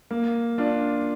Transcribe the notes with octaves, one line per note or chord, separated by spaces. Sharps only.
A#3
D4 F4